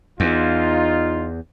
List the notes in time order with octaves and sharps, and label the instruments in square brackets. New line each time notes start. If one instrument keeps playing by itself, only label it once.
[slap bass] E2 [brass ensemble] D#4 F4